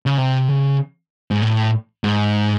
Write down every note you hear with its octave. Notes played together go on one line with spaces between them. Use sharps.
C#3
C3
C#3
G#2
A2
G#2